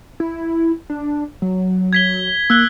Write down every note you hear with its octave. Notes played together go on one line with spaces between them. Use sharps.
E4
D4
F#3
G#6 B6 G7
A#3 E6 F#6 G7